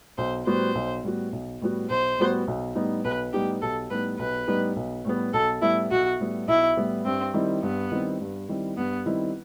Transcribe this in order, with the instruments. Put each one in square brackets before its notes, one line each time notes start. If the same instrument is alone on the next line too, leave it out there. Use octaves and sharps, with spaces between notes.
[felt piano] B1 [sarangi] C5
[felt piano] A2 G3 B3 F#4 [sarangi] C5
[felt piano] B1
A2 G3 B3 F#4
B1
A2 G3 B3 F#4
[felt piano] B1 [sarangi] C5
[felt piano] A2 G3 B3 F#4
B1
A2 G3 B3 D#4
[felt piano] B1 [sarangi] B4
[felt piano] A2 G3 B3 D#4 [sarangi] G4
[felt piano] B1 [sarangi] A4
[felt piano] A2 G3 B3 D#4 [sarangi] B4
[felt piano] B1 [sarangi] B4
[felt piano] A2 G3 B3 D#4
B1
A2 G3 B3
[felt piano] B1 [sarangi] A4
[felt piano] A2 G3 B3 [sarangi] E4
[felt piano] B1 [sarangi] F#4
[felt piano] A2 G3 B3
[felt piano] B1 [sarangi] E4
[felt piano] A2 G3 B3
[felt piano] G2 [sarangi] C4
[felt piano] D#3 G3 C4 E4
[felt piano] G2 [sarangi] B3
[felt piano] D#3 G3 C4 E4
G2
D#3 G3 C4 E4
[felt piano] G2 [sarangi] B3
[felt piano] D#3 G3 C4 E4